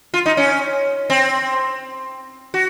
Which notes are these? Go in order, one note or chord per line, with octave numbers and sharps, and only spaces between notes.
F4
D#4
C#4
C4
F#4